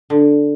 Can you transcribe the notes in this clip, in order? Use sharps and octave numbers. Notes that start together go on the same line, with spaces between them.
D3